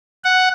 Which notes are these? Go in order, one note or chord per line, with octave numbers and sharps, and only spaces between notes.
F#5